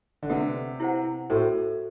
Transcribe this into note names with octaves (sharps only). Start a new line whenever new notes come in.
D3
C3 G4 B4 F#5
E4 G4 C5 F#5
A2 F#4 A4 C5